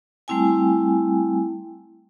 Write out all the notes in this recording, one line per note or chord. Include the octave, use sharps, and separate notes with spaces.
G3 A3 C4 E4 G5 G#5